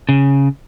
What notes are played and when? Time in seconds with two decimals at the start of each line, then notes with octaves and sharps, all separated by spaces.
0.09 C#3